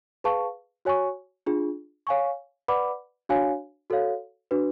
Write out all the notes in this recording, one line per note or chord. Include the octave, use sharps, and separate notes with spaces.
G#4 B4 F5 A5 C#6
F#4 C#5 G#5 C#6
D4 F4 G#4
C#5 F5 G#5 C#6
B4 D5 F#5 B5 D6
D4 F#4 C#5 F5 G#5
F#4 A4 C#5 F5
D4 F#4 B4